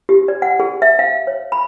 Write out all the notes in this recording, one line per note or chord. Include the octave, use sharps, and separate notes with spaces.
G4
D5
F#5
G#4
E5
F5
C#5
B5